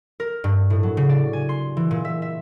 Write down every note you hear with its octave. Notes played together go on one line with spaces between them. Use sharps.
A#4
G2
A2
F#3
C#3
D5
G#5
C6
E3
A#2
E5
E5